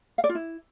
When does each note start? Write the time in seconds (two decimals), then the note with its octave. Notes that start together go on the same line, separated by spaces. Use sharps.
0.18 F5
0.24 D5
0.29 F4
0.35 E4